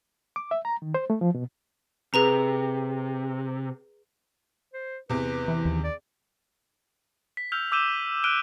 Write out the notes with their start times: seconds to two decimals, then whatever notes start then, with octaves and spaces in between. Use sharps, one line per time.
0.36 D6
0.51 E5
0.65 A#5
0.82 D#3
0.94 C5
1.10 A3
1.21 F3
1.35 B2
2.14 C3 G#4 B4 A#5
4.74 C5
5.10 E2 C3 B4
5.48 E3
5.65 D#2
5.84 D5
7.37 B6
7.52 E6 F6 G6 F7
7.72 D6 E6 G6 D#7 E7 G7
8.24 F6 F#6 D7 D#7 G7